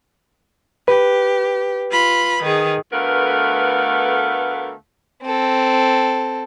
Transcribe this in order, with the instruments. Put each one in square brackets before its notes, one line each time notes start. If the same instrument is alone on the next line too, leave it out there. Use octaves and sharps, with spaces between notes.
[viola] G4 [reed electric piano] B4
[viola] F4 B5
D#3 G#4
[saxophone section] D2 A3 B3 A#4 B4 F5
[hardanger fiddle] C4 A4